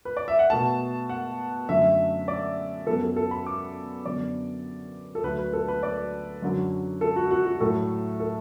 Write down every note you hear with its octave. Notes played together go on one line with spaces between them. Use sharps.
B4
D5
E5
F#5
B2 A3 A5
F#5
F#2 D3 A3 E5
D5
F#2 F#3 B3 A4
A4
A4
B5
D6
F#2 D3 B3 D5
A4
D2 D3 F#3 A3 B4
B4
A4
B4
D5
F#2 D3 F#3
A4
F#4
F#4
F#4
A2 F#3 A3 A4
A4